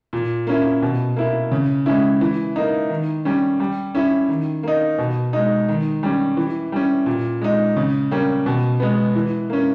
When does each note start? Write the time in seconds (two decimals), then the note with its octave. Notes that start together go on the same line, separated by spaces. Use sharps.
0.13 A#2
0.47 A#3 C#4 E4
0.82 B2
1.16 A#3 E4
1.51 C#3
1.86 G#3 C#4 E4
2.21 E3
2.56 A#3 D#4
2.90 D#3
3.25 G3 C#4
3.60 G3
3.95 C#4 E4
4.29 D#3
4.63 A#3 D#4
4.98 B2
5.33 G#3 D#4
5.68 D#3
6.03 G3 C#4
6.37 E3
6.72 G3 C#4
7.06 A#2
7.42 G#3 D#4
7.76 C#3
8.11 G3 A#3 C#4
8.46 B2
8.80 G#3 B3
9.15 E3
9.50 A#3 C#4